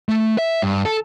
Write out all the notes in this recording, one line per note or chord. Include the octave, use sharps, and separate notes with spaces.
A3
E5
G2
A4